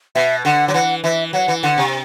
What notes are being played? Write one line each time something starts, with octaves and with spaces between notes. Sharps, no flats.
B2 E5
D3 F#5
F#3
E3 F#5
E3 E5
F#3 F#5
E3
D3 F#5
C3